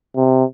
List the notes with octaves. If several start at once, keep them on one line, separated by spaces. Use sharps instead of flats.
C3